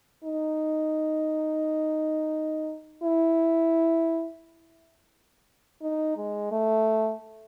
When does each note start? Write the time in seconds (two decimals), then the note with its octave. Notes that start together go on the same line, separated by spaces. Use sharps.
0.24 D#4
3.03 E4
5.82 D#4
6.17 G#3
6.51 A3